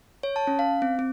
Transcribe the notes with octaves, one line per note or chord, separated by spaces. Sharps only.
C#5
A5
C#4
F5
C4
C4